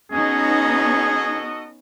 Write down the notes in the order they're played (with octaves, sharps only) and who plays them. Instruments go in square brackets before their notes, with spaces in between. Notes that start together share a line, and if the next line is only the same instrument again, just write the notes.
[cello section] B3 C#4 D#4 [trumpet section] F#4 A4 D#5 [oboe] G#4